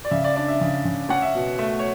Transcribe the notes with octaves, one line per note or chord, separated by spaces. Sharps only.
D5
C#3 E5
D5
D4 D5
E5
C#3
C#3
C#4 F#5
E5
B2
A3 E5
C#5